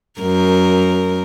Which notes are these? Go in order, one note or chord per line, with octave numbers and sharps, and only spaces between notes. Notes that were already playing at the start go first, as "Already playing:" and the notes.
F#2 A#4